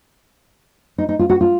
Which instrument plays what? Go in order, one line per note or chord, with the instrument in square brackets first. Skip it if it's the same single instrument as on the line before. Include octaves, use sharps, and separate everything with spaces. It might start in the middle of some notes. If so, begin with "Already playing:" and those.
[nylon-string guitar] D#4
D#4
F4
F#4
F4